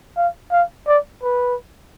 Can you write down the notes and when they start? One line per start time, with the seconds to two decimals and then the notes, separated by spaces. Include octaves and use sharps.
0.17 F5
0.52 F5
0.87 D5
1.23 B4